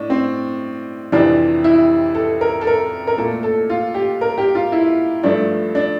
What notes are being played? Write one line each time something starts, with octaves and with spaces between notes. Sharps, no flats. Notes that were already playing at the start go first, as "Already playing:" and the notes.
Already playing: A2 D4
C4
F2 C3 E3 D4
E4
A4
A#4
A4
A#4
A#4
A#2 A3 A4
A4
F4
G4
A#4
G4
F4
E4
G2 F3 A3 D4
D4